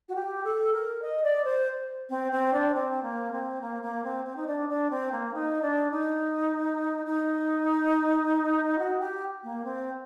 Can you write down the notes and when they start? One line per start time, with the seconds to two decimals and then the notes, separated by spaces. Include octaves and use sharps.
0.09 F#4
0.15 G4
0.44 A4
0.73 A#4
1.02 D#5
1.23 D5
1.44 C5
2.09 C4
2.32 C4
2.53 D4
2.74 C4
3.03 A#3
3.32 C4
3.61 A#3
3.82 A#3
4.04 C4
4.25 C4
4.36 D#4
4.47 D4
4.69 D4
4.90 C4
5.12 A#3
5.34 D#4
5.62 D4
5.91 D#4
7.06 D#4
8.78 F#4
9.00 G4
9.43 A#3
9.64 C4